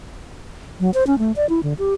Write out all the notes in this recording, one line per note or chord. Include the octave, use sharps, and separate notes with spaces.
F#3
C5
C#4
A3
D5
E4
D3
G4